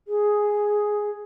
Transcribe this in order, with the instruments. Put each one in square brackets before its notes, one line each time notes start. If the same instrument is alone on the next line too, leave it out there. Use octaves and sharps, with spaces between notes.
[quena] G#4